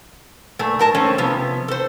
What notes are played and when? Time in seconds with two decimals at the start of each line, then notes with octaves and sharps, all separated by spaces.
0.59 A#2 A3
0.79 G#2 A#4 A5
0.95 A3 C4 C#4
1.18 C3 F3 B3
1.68 A4 C5